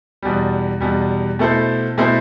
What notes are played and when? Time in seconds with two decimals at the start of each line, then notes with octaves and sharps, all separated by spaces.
0.22 E2 B2 G3
0.81 E2 B2 G3
1.39 B2 A3 E4 A4 C5
1.98 B2 A3 E4 A4 C5